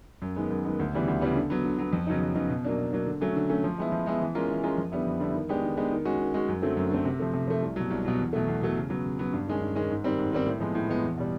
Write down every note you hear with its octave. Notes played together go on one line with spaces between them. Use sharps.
F#2
D#3 G#3 B3
F#2
D#3 G#3 B3
D2
C#3 E3 G3 B3
D2
C#3 E3 G3 B3
D3
F#3 B3
D3
F#3 B3
F2
C#3 F#3 B3 D#4
F2
C#3 F#3 B3 D#4
B2
F#3 A#3 D4
B2
F#3 A#3 D4
D3
F#3 A3 C#4
D3
F#3 A3 C#4
F3
G#3 B3 E4
F3
G#3 B3 E4
E3
G#3 C#4 F4 A#4
E3
G#3 C#4 F4 A#4
F2
D3 G3 B3 E4
F2
D3 G3 B3 E4
D#3
G#3 B3 D4 G4
D#3
G#3 B3 D4 G4
D#3
G#3 C#4 F#4
D#3
G#3 C#4 F#4
F#2
D3 F#3 A3 C4
F#2
D3 F#3 A3 C4
C3
F3 A3
C3
F3 A3
C2
B2 F#3
C2
B2 F#3
E2
B2 F#3 A3
E2
B2 F#3 A3
C#3
F#3 B3
C#3
F#3 B3
G2
D#3 G#3 C#4
G2
D#3 G#3 C#4
G#2
D#3 G3 C4
G#2
D#3 G3 C4
A2
F3 G#3 B3
A2
F3 G#3 B3
E2
B2 G3